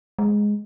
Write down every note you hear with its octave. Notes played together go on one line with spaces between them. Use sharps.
G#3